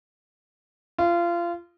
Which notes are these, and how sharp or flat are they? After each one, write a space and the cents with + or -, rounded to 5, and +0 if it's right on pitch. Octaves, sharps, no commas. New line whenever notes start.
F4 -25